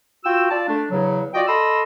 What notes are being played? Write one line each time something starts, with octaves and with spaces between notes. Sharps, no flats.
F4 F#4 G5 E6
F4 D5 A5
A3 D4
E2 C#3 F#3
F4 F#4 D5 D#5 G5
A4 D#5 B5 C6 E6